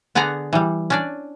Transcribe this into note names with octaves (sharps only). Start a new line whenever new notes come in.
D3 B3 G#4 D5 F#5 A#5
E3 G3
C#4 D4 D5